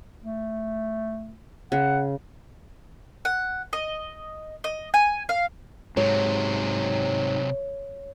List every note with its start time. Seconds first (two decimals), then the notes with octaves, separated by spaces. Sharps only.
0.24 A3
1.72 C#3 F#5
3.25 F#5
3.73 D#5
4.64 D#5
4.94 G#5
5.29 F5
5.97 G#2 C3 F#3 C#5